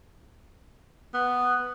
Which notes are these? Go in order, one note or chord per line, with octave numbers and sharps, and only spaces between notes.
B3